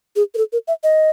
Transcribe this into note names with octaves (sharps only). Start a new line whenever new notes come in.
G#4
A#4
A4
A#4
E5
D#5